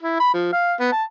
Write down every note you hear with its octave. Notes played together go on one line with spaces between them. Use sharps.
E4
B5
F3
F5
B3
A5